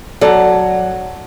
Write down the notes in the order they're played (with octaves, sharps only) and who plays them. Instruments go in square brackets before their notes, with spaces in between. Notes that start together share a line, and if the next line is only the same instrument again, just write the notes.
[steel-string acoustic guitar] F#3 [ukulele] A4 D5 A5